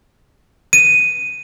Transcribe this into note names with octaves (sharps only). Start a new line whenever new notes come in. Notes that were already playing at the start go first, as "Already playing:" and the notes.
D#7